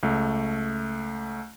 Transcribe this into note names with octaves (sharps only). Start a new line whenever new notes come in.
C#2 A3